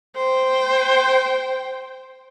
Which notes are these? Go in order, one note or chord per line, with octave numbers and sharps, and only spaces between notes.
C5 G5